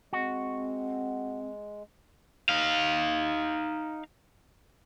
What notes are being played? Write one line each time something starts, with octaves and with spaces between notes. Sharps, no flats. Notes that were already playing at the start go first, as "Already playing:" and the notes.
G#3 C4 F#4
D#4 F5